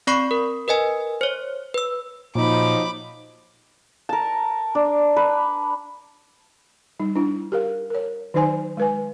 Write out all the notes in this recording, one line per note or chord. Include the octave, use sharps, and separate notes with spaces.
C4 D5 B5 C#6 C7
A#4
A#4 B4 D#5 G#5
C5 C#5
B4 E6
A#2 F3 F#3 D#4 B5 D6
A#4 A5
D4
B4
G3 D#4
D4 E4
G4 A#4 F5
A#4 C#5
D#3 F#3 D#4 C5 G#5 C6
G#3 B4 G#5